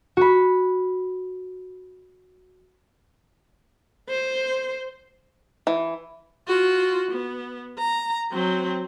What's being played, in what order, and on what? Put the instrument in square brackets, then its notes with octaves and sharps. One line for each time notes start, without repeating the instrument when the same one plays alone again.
[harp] F#4 B5
[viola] C5
[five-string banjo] E3
[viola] F4 F#4
B3
A#5
F#3 C4